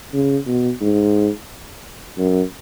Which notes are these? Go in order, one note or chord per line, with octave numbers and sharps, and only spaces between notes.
C#3
B2
G#2
F#2